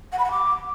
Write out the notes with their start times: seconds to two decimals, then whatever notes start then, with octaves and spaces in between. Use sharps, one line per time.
0.12 F#5
0.18 B5
0.24 F#5
0.30 D6